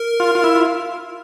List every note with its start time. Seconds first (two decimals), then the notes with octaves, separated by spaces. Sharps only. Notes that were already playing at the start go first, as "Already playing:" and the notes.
Already playing: A#4
0.20 F4
0.35 F4
0.44 E4
0.55 F4